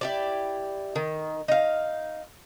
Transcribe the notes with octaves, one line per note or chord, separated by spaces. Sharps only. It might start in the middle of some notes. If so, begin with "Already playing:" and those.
E4 G4 D5
D#3
D#4 F5